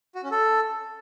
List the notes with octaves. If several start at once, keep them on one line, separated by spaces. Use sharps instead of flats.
F#4
C#4
A4